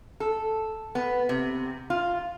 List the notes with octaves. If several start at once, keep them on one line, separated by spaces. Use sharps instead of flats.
A4
B3
C3
F4